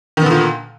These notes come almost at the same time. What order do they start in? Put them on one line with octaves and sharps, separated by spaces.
D#3 B3 D3 A#2